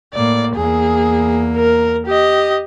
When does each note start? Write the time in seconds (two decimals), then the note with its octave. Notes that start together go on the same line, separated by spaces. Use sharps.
0.14 A2 A#3 D5
0.56 E2 A#3 G#4
1.57 A#4
2.07 G4 D#5